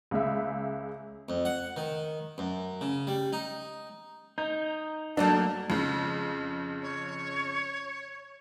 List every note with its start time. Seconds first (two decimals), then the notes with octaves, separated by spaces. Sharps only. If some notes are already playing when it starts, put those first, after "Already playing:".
0.11 C#2 C#3 G#3 E5
1.29 F2
1.45 F#5
1.77 D#3
2.38 F#2
2.81 C#3
3.07 G3
3.33 D#4
4.38 D#4 G6
5.17 F#3 A3 A#3 D4 A5
5.70 F2 C#3
6.82 C#5